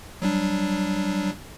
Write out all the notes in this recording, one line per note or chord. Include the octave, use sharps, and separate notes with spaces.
F#3 G3 D4